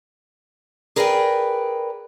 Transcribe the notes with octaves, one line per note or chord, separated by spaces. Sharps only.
G#4 A#4 B4 D5 F#5 G5